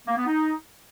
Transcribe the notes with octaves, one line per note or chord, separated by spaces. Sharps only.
A#3
B3
D#4